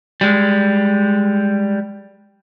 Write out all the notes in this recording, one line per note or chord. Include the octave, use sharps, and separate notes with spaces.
G3 G#3